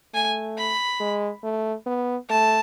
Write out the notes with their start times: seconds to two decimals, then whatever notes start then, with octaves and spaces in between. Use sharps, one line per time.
0.14 A3 G#5
0.57 B5
1.00 G#3
1.43 A3
1.86 B3
2.29 A3 A5